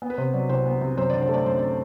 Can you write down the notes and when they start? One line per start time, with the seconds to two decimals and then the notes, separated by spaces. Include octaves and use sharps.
0.02 B3
0.10 B4
0.18 C3 C5
0.34 F#3 D5
0.49 C2 C5
0.66 B3
0.81 C3
0.97 F#2 C5
1.10 D3 D5
1.22 C5
1.29 A3 D5
1.45 F#2 C5
1.59 D5